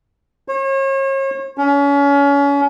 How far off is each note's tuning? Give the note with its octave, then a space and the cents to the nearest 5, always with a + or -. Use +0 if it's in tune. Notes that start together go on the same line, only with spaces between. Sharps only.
C#5 -40
C#4 +30